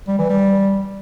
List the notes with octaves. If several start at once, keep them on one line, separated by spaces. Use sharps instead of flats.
G3
E3
G3